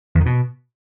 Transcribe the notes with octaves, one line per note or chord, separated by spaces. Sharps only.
E2
D#3
B2